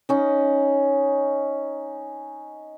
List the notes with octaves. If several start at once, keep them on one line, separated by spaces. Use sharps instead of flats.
C#4 D#4